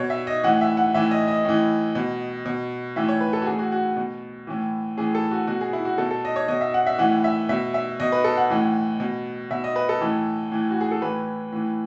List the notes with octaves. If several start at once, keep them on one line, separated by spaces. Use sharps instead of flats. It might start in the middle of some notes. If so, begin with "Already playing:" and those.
Already playing: B2 C#5
E5
D#5
A2 E3 F#5
E5
F#5
A2 E3 E5
D#5
D#5
A2 E3
B2
B2
A2 E3 E5
C#5
B4
A4
F#4
A2 E3 G#4
F#4
F#4
B2
A2 E3
A2 E3 G#4
A4
F#4
B2 F#4
G#4
E4
F#4
B2 A4
A4
D#5
C#5
B2 D#5
E5
F#5
E5
A2 E3 F#5
E5
B2 E5
E5
B2 D#5
B4
A4
F#5
A2 E3
B2
B2 E5
D#5
B4
A4
A2 E3
A2 E3
F#4
G#4
A4
A2 E3 B4
A2 E3